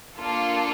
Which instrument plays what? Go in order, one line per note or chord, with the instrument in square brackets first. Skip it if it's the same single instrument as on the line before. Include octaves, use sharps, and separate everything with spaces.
[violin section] A#3 D4 F4 A4